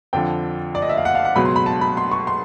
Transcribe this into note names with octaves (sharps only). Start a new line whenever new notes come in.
F2 D3 F3 G5
D5
D#5
E5
F5
F#5
F5
F#5
C#2 B2 F#3 B5
C6
B5
A5
B5
C6
C#6
C6